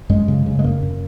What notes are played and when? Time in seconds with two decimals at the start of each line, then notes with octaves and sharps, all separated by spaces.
0.10 F#2 G#3
0.28 C#3
0.46 C#3
0.59 G#3
0.64 F#2 A#3
0.82 F#2